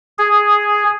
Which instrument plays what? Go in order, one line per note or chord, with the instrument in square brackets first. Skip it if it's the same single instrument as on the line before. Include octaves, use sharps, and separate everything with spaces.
[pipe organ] G#4